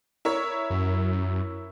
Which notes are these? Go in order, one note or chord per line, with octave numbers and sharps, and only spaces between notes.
E4 A#4 C#5
F#2